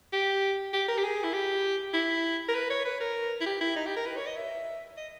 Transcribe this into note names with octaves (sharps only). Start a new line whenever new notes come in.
G4
G4
A#4
G4
G#4
E4
G4
E4
A#4
B4
C#5
B4
A#4
E4
G4
E4
D#4
G4
A#4
B4
C#5
D#5
E5
D#5